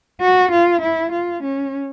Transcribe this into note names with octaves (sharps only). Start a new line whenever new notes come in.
F#4
F4
E4
F4
C#4